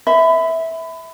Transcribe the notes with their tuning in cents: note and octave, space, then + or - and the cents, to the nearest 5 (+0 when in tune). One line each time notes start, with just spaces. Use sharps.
E5 -15 B5 +25